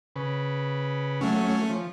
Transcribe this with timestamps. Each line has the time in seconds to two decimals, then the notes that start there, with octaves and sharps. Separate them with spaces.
0.16 C#3 B4
1.21 F#3 A3 C#4
1.70 F3